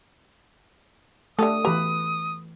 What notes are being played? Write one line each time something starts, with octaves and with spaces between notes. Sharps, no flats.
D3 A3 G4 A4 D#6
E3 G4 B4 A#5